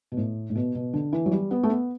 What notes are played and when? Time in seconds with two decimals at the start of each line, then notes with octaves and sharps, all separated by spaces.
0.12 B2
0.17 A2
0.50 A2
0.55 B2
0.75 B2
0.93 D3
1.13 E3
1.26 F#3
1.31 G3
1.51 B3
1.63 A3
1.70 B3